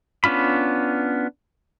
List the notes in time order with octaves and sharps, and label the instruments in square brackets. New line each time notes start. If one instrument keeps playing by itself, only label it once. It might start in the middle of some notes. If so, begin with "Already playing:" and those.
[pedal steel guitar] B3 C#4 D4 F4 B5